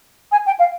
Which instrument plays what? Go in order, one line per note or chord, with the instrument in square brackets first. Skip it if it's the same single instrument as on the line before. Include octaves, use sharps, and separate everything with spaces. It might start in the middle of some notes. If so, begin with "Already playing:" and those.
[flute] G#5
G5
F5